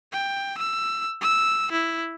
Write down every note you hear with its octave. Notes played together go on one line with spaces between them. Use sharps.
G5
E6
E6
E4